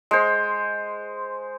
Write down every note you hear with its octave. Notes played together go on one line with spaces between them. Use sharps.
G#3 C5